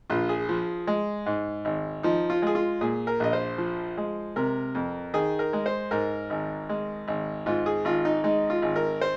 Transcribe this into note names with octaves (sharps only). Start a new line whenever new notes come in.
A#1 F4
G#4
F3
G#3
G#2
G#1
F3 D#4
F4
G#3 G#4
F4
A#2 G#4
A#4
A#1 D#5
C5
F3
G#3
C3 A#4
F2
D#3 G#4
A#4
G#3
C5
G#2 A#4
G#1
G#3
G#1
G#2 F4
G#4
G#1 F4
D#4
G#3 D#4
F4
G#1
A#4
C5